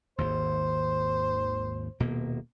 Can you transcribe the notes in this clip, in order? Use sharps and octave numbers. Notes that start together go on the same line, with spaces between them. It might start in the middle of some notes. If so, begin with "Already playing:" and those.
G#1 D#2 C5
D#1 B2 A#3